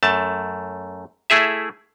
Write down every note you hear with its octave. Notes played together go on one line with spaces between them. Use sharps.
F#2 A3 A5
A3 E4 G#4 E5